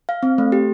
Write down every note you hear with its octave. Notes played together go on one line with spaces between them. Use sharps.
F5
C4
A3
G4